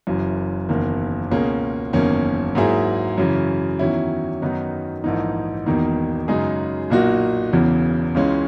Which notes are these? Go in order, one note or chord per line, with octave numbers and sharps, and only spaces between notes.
F#1 F#2 E3
F#1 E2 D#3 A#3
C#2 B2 A#3 C#4 G#4
F#1 E2 D#3 A#3 C#4
G#2 F#3 A#3 E4 G#4
F#2 C#3 E3
E2 D#3 F#3 C#4 E4
F#2 D#3 F#3 B3 D#4
A#1 G#2 E3 A#3 D#4
E1 E2 D#3 A#3 D#4
F#2 C#3 G#3 D#4 G#4
B1 A#2 A#3 D#4 F#4
E1 E2 C#3 E3
C#2 C#3 E3 G#3 C#4